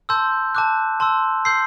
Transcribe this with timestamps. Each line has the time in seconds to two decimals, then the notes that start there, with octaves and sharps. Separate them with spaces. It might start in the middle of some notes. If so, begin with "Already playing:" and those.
0.09 A5 C6 E6 G6
0.55 A5 D6 F#6
1.00 A5 C6 E6
1.45 C6 E6 G6 C7